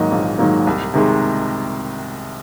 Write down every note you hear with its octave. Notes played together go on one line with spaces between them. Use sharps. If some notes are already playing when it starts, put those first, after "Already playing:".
Already playing: G#2 D#3 F#3 A#3 D#5
A#1
G#2 D#3 F#3 A#3
C2
C3 D#3 G#3